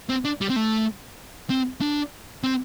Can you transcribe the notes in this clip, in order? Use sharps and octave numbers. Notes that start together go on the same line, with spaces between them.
C4
D4
G3
C4
A3
C4
D4
C4